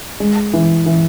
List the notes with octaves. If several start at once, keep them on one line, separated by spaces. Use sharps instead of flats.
G#3
E3
E3